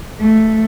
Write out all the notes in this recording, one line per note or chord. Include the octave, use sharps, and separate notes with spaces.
A3